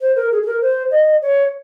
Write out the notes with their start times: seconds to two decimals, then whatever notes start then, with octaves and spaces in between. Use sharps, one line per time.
0.01 C5
0.16 A#4
0.32 G#4
0.43 G#4
0.46 A#4
0.62 C5
0.91 D#5
1.22 C#5